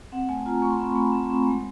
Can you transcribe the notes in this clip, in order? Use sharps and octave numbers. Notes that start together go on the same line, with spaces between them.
C4 F#5
A3 G#5
F4 A#5
A3 C#6
C6
C4 B5
A3
C4
C4
G#3